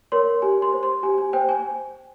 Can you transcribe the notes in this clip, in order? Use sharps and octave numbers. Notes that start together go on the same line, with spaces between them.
A#4 C#5 C6
G4 G#5
C6
C5
C6
G4 G#5
G#5
C5 G5
G#5